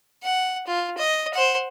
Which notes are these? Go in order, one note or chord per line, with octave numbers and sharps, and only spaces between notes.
F#5
F4
D#5
C5 F#5